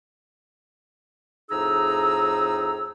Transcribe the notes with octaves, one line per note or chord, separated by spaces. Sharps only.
F2 A2 D#4 G#4 A#5 E6